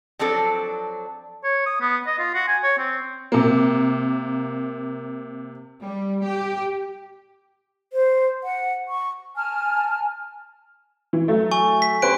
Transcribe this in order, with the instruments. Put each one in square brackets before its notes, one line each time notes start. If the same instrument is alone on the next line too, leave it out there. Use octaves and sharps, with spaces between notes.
[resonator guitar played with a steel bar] F3 F#3 C4 D4 A4
[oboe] C#5
D#6
B3
D#5
F4
F#4
G#5
C#5
C4
[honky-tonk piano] C3 A#3
[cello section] G3
G4
[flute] C5
F#5
C#6
[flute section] G#5 A5 F6
[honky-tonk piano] E3
F#3 A3
[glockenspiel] G#5 C#6
B6
[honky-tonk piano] G4 B4 C5 [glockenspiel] F#6 D7